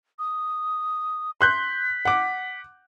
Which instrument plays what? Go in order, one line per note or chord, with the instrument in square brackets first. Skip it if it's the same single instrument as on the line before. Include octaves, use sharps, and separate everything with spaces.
[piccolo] D#6
[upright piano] C6 F#6 G6 [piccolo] B6
[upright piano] F#5 D6